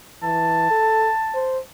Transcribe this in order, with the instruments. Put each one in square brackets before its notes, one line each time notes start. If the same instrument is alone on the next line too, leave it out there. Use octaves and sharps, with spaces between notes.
[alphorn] E3 [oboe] A5
[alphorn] A4
C5